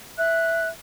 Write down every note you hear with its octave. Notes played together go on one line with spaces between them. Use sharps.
E5 F#6